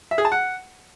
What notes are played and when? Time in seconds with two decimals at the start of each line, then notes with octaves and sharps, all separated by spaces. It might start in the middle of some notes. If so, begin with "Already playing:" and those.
0.11 E5
0.18 G#4
0.25 A5
0.32 F#5